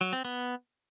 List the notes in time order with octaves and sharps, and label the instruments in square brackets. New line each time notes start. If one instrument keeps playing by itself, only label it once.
[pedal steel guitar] F#3
C4
B3